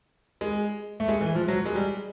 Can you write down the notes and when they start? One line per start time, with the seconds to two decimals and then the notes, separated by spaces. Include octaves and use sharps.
0.41 G#3
1.00 A3
1.08 G#3
1.21 E3
1.35 F3
1.48 F#3
1.66 G#3
1.75 G3